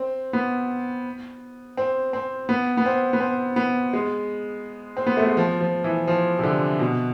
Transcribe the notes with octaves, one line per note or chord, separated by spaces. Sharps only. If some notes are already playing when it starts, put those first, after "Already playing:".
Already playing: C4
B3
C4
C4
B3
B3
C4
B3
C4
B3
G#3
C4
B3
A3
G#3
F3
F3
E3
F3
C3
D3
B2